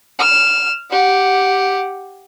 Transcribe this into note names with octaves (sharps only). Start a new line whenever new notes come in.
F6 E7
G4 F#5